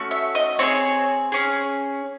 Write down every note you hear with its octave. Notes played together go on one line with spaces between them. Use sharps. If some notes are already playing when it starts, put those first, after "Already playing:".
Already playing: A3 C#4 F#4
E5
D#5
C4 E4 G#4 C#5
C#4 G#4